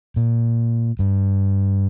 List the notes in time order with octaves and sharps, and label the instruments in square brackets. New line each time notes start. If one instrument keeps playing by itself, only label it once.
[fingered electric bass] A#2
G2